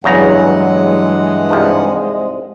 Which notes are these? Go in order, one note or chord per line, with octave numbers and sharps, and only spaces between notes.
E2 G2 C#3 E3 F#3 G#3 F#5 A#5
C2 G#2 F3